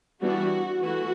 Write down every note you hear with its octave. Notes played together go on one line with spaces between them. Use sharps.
E3 G3 B3 D4 F#4
E3 A3 F#4